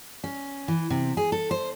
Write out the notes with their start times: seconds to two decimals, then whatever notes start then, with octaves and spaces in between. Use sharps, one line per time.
0.24 C#4
0.68 E3
0.90 C3
1.17 G#4
1.32 A4
1.51 C5